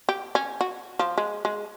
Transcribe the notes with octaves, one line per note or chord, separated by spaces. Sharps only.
G4
C#4
F#4
F3
G#3
G#3